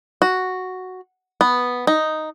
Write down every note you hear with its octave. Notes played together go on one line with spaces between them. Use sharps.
F#4
B3
D#4